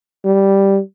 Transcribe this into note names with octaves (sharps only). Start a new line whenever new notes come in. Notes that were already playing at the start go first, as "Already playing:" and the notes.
G3